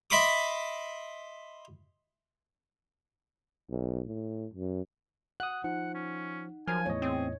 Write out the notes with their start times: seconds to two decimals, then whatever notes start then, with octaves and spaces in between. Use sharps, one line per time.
0.10 D#5 E5 B5 C6 D6 D#6
3.70 B1
4.07 A2
4.53 F#2
5.40 F#5 D#6 F#6
5.64 F3 D#4 F#5
5.95 C#4
6.68 F3 F#3 A#4 G#5 F6
6.86 E2 A2 C#5 D#5
7.02 C4 G#4